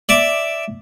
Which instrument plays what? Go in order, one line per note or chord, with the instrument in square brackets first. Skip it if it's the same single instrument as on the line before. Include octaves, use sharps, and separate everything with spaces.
[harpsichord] D5 E5 D6